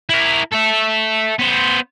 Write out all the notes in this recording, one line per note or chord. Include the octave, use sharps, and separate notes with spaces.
E4 A#4
A4 E5
B3 C5